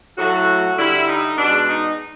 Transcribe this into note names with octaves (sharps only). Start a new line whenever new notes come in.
A2 F#3 A3 F#4
D3 G3 E4
D#4
B2 G#3 D4
D#4